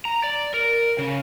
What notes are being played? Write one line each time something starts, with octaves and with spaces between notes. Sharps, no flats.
A#5
D5
A#4
C#3